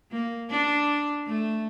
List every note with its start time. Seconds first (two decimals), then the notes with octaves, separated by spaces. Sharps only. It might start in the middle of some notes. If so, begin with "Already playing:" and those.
0.11 A#3
0.50 D4
1.27 A3